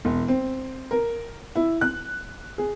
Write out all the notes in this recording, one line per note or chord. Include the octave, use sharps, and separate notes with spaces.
E1
C4
A#4
E4
F#6
G#4